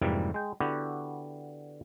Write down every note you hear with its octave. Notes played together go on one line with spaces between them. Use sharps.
F2 G#2 C3 E3 G3 A#3
G#3 G5
D3 B3 E4 F#4 G4